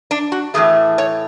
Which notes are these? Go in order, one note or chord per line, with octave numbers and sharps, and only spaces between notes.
D4
F#4
A2 E3 A3 G#4
C#5